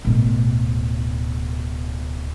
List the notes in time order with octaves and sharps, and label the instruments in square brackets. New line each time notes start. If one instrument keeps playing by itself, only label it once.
[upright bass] D1 B2